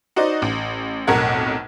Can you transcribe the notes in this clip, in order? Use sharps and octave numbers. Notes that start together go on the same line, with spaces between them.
D#4 F#4 C5 D5 D#5
A1
B1 F2 A2 A#4 F#5 G#6